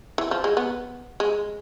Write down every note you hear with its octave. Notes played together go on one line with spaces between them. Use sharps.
E3
F3
G#3
B3
G#3